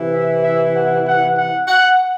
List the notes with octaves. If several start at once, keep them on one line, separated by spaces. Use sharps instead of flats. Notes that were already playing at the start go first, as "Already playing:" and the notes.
Already playing: C3 E3
E5
E5
F#5
F#5
F#5
F#5